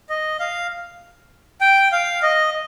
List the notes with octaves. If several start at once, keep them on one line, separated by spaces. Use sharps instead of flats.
D#5
F5
G5
F5
D#5